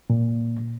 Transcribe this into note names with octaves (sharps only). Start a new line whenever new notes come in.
A#2